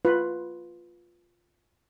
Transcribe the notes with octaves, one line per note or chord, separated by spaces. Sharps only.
F4 B4